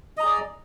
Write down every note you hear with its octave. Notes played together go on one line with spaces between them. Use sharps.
G#4 D5 D#5 A#5